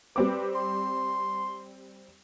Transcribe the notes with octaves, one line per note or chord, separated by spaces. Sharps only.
G3 C4 B4 D6
C6